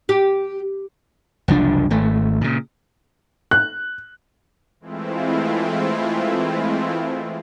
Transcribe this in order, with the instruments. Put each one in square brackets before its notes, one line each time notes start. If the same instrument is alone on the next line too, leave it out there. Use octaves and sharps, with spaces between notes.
[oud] G4
[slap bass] F#1 C2 F3 D4
G#1 A3
A#2 C#3
[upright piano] F#6
[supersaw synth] E3 G#3 A3 C4 E4 F4